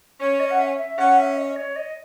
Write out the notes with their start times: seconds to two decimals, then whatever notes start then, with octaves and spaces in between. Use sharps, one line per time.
0.20 C#4 C#5
0.40 D#5
0.51 F#5
0.59 E5
0.78 E5
0.98 C#4 F#5
1.18 E5
1.37 D#5
1.56 C#5
1.76 D#5